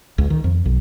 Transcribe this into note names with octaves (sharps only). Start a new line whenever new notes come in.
C#2
D#3
F2
B1